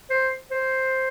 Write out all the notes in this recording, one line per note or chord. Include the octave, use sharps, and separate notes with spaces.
C5
C5